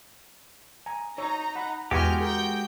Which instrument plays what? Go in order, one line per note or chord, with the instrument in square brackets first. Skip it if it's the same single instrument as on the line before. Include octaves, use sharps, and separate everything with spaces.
[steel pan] G#5 A#5
[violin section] D#4 A#5 [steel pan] C#5
[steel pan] F#5 B5
[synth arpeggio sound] E2 [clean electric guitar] G#3 F#4 G4 [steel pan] G#5 [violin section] F6 G6
[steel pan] G#4 A#4 [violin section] G5 G6